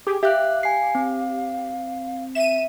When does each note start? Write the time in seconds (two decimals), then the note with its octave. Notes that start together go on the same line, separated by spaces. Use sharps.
0.07 G4 G#4 D6
0.23 G4 E5 F5 F#6
0.63 G#5 C7
0.95 C4
2.35 E5 D#7 E7